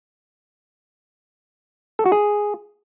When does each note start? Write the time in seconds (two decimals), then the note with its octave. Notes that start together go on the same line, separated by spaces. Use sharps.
1.99 A4
2.06 F#4
2.12 G#4